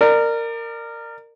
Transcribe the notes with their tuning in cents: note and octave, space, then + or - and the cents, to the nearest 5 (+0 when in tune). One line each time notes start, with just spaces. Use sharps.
A#4 -15 D5 +30